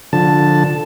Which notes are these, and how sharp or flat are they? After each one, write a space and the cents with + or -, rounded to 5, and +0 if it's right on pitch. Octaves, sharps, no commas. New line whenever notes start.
D3 +0 F3 +20 A5 +0